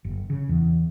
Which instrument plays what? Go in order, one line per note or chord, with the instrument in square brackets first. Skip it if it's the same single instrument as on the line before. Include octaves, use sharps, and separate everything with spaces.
[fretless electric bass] F#1
C#3
E2